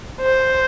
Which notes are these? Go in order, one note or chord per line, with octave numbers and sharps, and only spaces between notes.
C5